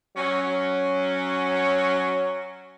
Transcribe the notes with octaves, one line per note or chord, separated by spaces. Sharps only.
F#3 C#4